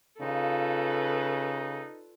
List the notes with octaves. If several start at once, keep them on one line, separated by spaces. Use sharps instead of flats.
C#3 D#4 F4 A4 B4 D5